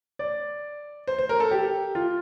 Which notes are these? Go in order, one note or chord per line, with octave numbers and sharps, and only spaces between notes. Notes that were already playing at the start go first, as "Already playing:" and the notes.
D5
C5
C5
A#4
A4
G4
F4